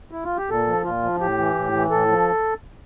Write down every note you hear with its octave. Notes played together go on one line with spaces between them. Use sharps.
E4
F4
G4
A#2 A4
F3
A#2 F4
F3
A2 G4
E3
A2
E3
A2 A4
F3